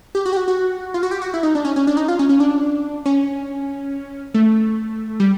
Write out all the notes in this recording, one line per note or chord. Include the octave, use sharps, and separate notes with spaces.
G4
F#4
G4
F#4
F#4
F4
F#4
G4
F#4
E4
D#4
D4
C#4
C#4
D4
D#4
F4
C#4
C#4
D4
C#4
A3
G3